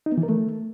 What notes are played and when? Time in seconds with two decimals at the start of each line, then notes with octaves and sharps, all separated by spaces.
0.06 D#4
0.12 B3
0.18 E3
0.23 A#4
0.29 A3